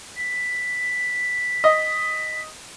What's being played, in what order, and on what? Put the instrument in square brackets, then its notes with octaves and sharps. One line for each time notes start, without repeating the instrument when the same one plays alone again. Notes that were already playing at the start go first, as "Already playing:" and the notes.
[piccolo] B6
[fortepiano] D#5